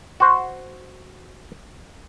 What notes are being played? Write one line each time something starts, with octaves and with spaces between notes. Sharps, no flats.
F#4 C5